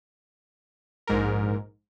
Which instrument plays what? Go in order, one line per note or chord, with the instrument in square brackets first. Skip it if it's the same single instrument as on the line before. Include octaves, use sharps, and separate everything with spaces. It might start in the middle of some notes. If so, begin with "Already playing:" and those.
[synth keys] A#1 G#2 A#4